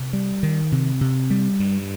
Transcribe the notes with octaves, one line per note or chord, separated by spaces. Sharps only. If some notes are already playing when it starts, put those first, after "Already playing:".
Already playing: C3
G3
D#3
C3
C3
G3
G2